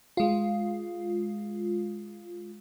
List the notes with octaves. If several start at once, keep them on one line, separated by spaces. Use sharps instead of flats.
G#3 F4